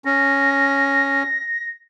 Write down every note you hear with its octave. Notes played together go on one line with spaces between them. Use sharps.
C#4 A#6